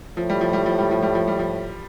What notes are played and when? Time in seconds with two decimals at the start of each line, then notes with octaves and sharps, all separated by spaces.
0.17 A2 F3
0.30 G3
0.41 F3
0.53 G3
0.66 F3
0.78 G3
0.91 F3
1.03 G3
1.15 F3
1.28 G3
1.39 F3